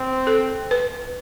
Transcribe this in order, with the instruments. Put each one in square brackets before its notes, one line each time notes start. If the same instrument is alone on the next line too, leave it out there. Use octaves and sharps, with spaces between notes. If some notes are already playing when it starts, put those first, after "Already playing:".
Already playing: [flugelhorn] C4
[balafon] A4
B4